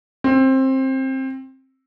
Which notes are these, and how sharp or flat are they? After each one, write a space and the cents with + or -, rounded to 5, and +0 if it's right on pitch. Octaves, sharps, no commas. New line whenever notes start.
C4 +20